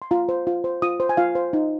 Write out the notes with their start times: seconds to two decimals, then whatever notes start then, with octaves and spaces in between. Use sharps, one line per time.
0.02 C6
0.11 F4 A#5
0.29 C5
0.47 F4
0.64 C5
0.82 F4 D#6
1.00 C5
1.09 G#5
1.17 F4 F5
1.35 C5
1.53 D#4